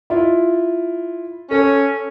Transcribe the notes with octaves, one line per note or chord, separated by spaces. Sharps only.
E4 F4
C#4 A4